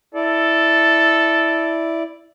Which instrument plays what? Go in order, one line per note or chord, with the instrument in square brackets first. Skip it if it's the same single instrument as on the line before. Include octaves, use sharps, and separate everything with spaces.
[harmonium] E4 D5 [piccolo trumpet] A4